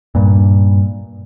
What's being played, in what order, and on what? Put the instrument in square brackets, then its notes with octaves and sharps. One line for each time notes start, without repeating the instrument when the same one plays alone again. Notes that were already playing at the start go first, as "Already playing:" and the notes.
[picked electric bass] G2 A#2